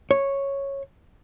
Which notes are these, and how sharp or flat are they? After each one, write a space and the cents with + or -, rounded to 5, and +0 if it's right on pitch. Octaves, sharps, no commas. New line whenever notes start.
C#5 -5